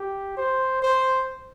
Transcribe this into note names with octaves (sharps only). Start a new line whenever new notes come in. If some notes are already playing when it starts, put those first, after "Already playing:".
Already playing: G4
C5
C5